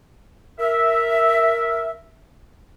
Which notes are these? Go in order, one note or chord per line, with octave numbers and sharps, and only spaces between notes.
A#4 E5